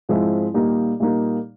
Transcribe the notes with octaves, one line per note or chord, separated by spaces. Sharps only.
G#2 F3 G#3 C4 E4
A#2 G3 A#3 D#4
A#2 G3 A#3 D#4